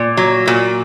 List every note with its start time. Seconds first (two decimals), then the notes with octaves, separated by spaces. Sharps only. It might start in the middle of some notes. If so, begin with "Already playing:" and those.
Already playing: A#2
0.17 F#3
0.47 A#2